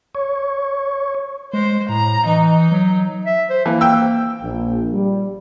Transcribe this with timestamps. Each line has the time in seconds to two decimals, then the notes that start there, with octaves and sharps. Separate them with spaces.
0.15 C#5
1.53 G#3 C5
1.89 A2 A#5
2.26 E3 D#4
2.72 F#3
3.26 E5
3.50 C5
3.66 E3 A#3
3.81 G5 E6
4.43 A#1
4.93 G3